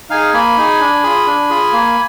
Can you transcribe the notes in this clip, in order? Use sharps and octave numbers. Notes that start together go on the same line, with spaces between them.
D#4 G#4 F5 G#5
A#3 G#5 B5
D#4 G#4
D4
F4 G#4
D4
F4 G#4
A#3